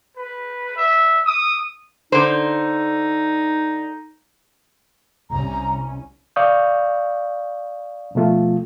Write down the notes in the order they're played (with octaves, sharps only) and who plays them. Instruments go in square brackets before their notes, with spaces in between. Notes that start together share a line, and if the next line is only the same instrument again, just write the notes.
[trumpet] B4
E5
D#6
[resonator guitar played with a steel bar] D3 C5 [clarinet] D#4
[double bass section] C2 C#4 [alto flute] A#5
[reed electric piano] D5 F5 C#6 D#6 G6
B2 F3 A3 F4